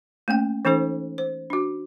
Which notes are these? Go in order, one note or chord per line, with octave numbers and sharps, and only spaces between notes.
A3 A#3 C#4 G5
E3 C#4 D#4 A4 C5
C5
D4 F#4